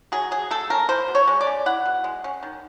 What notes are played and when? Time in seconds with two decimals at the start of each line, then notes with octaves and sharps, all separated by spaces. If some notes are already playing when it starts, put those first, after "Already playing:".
0.12 F#3 G#4
0.31 F#3 G#4
0.51 A3 A4
0.70 C#4 A#4
0.89 E4 C5
1.08 B2
1.15 C#5
1.27 G#3
1.41 D5
1.47 C#4
1.66 E4 F#5
1.85 B2
2.04 G#3
2.24 C#4
2.43 D#3